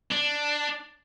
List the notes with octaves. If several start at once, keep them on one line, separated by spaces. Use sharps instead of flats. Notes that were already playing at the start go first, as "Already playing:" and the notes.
D4